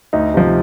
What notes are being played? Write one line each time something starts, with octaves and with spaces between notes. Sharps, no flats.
D2 D#4
C3 F3